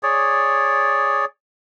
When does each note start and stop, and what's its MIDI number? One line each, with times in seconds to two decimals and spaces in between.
0.03 1.25 68
0.03 1.25 73
0.03 1.25 74